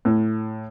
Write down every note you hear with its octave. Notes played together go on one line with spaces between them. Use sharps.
A2